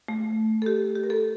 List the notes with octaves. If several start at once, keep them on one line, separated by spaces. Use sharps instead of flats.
A3
A4
G4
G4
A#4
A4